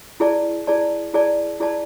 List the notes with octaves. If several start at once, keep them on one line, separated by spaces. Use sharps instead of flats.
E4 G#4 D5 A5
E4 G#4 D5 A5
E4 G#4 D5 A5
E4 G#4 D5 A5